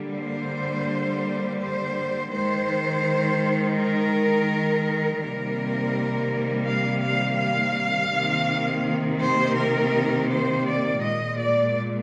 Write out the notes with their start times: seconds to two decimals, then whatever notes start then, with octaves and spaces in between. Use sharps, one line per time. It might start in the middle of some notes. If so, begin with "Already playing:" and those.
Already playing: D3 G3 A#3
0.15 C5
1.59 C5
2.32 D#3 G#3 C5
3.77 A#4
5.22 C3 D#3 G3 A#3 A#4
6.66 F5
7.02 F5
7.39 F5
8.11 C3 D#3 A#3
9.21 C5
9.56 A#4
10.30 C5
10.65 D5
11.02 A#2 G#3 D#5
11.38 D5